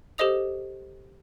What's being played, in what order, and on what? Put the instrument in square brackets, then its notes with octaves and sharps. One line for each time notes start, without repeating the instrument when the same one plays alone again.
[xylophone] G4 A4 C5 D#5 D#6 F7